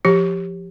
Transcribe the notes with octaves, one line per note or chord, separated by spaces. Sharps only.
F3 G4